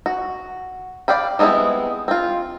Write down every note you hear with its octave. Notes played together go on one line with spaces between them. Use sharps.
F#4
D5 F5 G5 B5
G3 G#3 B3 C4 E4
C4 F4